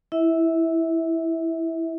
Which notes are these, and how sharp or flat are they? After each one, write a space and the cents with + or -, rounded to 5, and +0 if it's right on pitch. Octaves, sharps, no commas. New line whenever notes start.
E4 +0 E5 -25